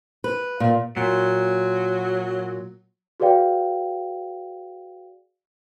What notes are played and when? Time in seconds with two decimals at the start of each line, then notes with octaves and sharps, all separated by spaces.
0.24 B4
0.60 A#2
0.97 A#2 F#3
3.20 F#4 G#4 B4 D5 F5 G5